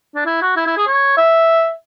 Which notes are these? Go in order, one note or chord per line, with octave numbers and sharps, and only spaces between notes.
D4
E4
F#4
E4
E4
G#4
C#5
E5